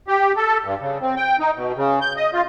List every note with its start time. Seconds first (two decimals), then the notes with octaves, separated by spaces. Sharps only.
0.08 G4
0.37 A4
0.64 G2
0.81 C#3
1.01 C4
1.17 G5
1.40 D#4
1.56 B2
1.76 C#3
2.01 G6
2.16 D#5
2.34 F4